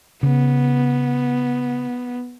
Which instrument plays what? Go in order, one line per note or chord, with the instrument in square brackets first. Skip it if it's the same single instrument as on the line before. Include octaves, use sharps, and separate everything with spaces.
[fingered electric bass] C#3 [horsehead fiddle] B3